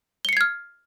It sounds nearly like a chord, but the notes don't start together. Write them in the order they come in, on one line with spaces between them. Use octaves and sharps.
G7 C#7 C7 G#6 F6